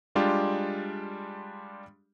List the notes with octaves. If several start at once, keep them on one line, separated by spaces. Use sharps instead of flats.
G3 G#3 D4 F4 G4